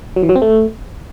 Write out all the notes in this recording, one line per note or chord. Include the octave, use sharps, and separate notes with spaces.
F#3
E3
F#3
C4
A3